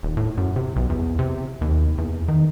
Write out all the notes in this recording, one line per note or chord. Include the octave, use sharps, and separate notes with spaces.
D#1
A2
F#2
C3
B1
E2
C3
D#2
E2
D#3